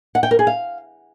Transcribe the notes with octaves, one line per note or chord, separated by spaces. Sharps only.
F#5
G5
A#4
G#4
F5